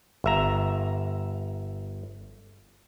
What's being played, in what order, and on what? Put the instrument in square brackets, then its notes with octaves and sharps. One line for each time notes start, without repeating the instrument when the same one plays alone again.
[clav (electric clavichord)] G1 E5 A#5